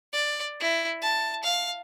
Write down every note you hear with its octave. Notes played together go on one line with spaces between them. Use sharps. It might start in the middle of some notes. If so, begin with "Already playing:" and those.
D5
E4
A5
F5